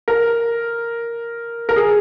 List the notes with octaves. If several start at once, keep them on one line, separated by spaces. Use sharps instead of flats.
A#4
A#4
G#4